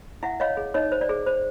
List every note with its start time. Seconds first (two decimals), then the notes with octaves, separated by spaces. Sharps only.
0.23 E4 E5 F#5
0.40 C#5 D#5 F5
0.57 G#4
0.74 D#4 C#5 D#5
0.92 C5
1.01 D5
1.09 G#4
1.26 C5